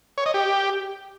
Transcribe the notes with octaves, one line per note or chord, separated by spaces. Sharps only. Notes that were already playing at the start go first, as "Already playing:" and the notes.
C#5
D#5
G4